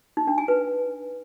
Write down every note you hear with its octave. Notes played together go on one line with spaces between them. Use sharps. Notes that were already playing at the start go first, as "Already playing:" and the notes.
D#4
D4
G#5
B4